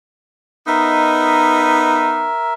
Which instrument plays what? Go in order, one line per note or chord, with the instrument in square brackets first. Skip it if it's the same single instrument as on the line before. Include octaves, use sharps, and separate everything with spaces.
[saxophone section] B3 D#4 [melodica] A#4 E5